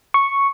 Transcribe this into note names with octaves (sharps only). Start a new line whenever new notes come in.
C#6